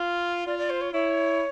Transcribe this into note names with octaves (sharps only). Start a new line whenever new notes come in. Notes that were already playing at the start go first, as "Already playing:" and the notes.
Already playing: F4
F4 D5
D5
C5
C#5
E4 C#5